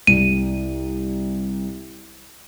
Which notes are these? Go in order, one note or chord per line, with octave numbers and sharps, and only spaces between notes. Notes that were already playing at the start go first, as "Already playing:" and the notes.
C2 D#7